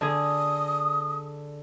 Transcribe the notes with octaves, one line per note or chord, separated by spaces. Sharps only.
D3 G#4 D#6